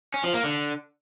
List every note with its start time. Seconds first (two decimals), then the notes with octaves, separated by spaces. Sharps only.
0.14 C#4
0.24 F3
0.34 A#3
0.43 D3